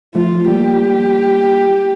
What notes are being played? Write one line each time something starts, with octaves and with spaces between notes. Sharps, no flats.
F3 A3 F4
G3 A#3 G4